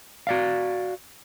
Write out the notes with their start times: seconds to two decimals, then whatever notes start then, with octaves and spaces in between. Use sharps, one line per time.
0.27 F#4 D5 F5